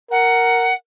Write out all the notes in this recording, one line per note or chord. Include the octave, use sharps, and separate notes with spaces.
A#4 F#5